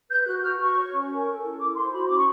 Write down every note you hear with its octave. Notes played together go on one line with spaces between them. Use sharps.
B4 G6
F#4 F#6
F#4 F6
F#4 C#6
C#5
C#4
A#4
A4
E4
E4 D6
C5 C6
F#4 B5
C#4 D6
C#6